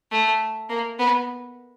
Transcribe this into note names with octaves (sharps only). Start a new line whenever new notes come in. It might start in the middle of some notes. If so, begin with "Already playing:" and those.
A3
A#3
B3